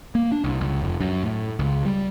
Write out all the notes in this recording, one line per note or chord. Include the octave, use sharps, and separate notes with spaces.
A#3
D4
C2
C#2
F1
F#2
A2
C#2
G3